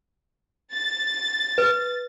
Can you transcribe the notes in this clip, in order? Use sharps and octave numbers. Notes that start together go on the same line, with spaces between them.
A6
B4